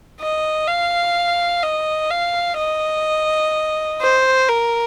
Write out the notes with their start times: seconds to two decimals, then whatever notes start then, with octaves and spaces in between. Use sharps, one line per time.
0.21 D#5
0.68 F5
1.63 D#5
2.11 F5
2.58 D#5
4.01 C5
4.49 A#4